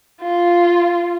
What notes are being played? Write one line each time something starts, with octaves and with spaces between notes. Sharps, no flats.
F4